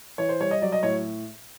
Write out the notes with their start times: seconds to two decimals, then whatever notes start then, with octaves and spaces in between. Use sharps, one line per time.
0.18 E3 C#5
0.29 C5
0.40 G3 C#5
0.51 D#5
0.62 F#3 D5
0.72 D#5
0.83 A2 C#5